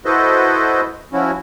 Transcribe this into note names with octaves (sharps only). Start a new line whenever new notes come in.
E4 F#4 A4 B4 C5 D#5
F3 C#4 E4 F#4